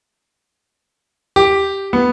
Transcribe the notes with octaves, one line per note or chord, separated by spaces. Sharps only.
G4
B3